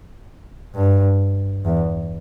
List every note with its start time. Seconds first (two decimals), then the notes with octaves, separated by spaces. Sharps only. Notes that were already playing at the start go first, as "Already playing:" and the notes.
0.75 G2
1.64 E2